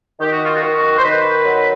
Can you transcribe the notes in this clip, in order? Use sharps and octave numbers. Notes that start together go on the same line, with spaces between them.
D#3 G4
F#4
F4
F#4
D#3
C5
D#3 B4
F#3